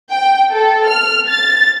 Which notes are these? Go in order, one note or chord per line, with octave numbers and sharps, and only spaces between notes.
G5
A4
F6
A6